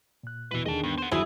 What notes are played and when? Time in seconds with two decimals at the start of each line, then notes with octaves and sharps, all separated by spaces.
0.23 A#2 F#6
0.51 E2 B2 E4 B4
0.66 D#2 D3 G#4 D#5 A5
0.83 G2 B3
0.98 C5 F#5
1.11 G1 D#3 E3 F#3 E4 F#4 G#4 B4